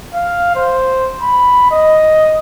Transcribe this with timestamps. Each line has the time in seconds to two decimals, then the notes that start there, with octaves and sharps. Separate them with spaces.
0.14 F5
0.56 C5
1.22 B5
1.72 D#5